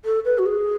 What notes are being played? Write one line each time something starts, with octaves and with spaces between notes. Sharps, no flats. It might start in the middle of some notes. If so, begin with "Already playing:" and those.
A4
B4
F#4
G#4